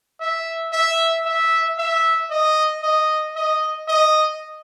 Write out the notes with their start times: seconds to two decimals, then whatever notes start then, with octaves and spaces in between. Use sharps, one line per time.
0.21 E5
0.73 E5
1.25 E5
1.78 E5
2.30 D#5
2.83 D#5
3.36 D#5
3.88 D#5